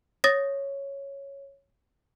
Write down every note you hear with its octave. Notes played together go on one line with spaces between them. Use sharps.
C#5 D#6 A6 A#6